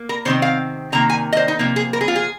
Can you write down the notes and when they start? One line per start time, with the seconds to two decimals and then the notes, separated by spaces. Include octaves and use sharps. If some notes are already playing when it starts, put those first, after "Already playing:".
Already playing: A#3
0.09 A#4
0.25 C3 D#3 C4 C5
0.42 F5
0.92 C3 D#3 A#3 A#5
1.10 G#5
1.33 D#5
1.37 C5
1.48 D#4
1.59 C3 F3 A#3 D#4
1.76 G#4
1.93 A#4
2.01 G#4
2.08 F4
2.16 G#4